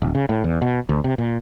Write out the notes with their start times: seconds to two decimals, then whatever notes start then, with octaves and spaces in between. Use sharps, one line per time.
0.02 D1
0.15 C#3
0.29 A2
0.44 E2
0.62 B2
0.89 D2
1.04 C3
1.18 A#2